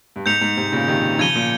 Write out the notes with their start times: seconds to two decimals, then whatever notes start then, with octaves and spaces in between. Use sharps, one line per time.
0.16 G2
0.26 G#2 G6 C#7 F7
0.41 G#2
0.57 G#2 C3
0.72 A#2 C#3
0.88 C3 D#3
1.19 C#3 F3 G#6 D#7 G7
1.35 A#2